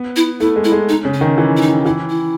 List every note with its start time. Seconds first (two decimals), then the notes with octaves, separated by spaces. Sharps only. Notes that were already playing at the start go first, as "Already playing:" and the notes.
Already playing: B3
0.16 E4
0.40 A3 E4
0.56 G#3
0.64 E4
0.72 G#3
0.89 D#4
1.05 C#3
1.14 C#4
1.21 D#3
1.38 E3
1.57 E4
1.61 D#4
1.86 E3 E4
2.09 E4